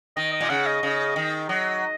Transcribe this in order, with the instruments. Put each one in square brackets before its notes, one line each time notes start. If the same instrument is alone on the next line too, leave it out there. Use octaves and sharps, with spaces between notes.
[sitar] D#3 [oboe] D#5
[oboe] D#5
[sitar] A#2
[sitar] C#3 [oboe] F#5
[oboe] D#5
[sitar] C#3
D#3
[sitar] F#3 [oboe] D#5